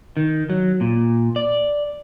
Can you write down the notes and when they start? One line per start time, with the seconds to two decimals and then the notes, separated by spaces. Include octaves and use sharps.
0.17 D#3
0.50 F#3
0.81 A#2
1.36 D5